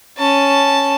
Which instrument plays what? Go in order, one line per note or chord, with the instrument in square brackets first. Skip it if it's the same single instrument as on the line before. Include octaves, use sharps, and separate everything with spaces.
[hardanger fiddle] C#4 A5